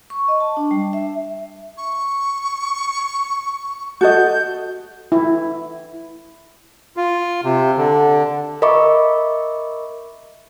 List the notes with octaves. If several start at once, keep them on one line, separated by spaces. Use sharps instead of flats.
C#6
D#5
A5
D4
G3
E5
C#6
F#4 A4 D#5 G6
E4
F4
C3
D3
A#4 D#5 E5 B5 C#6 D6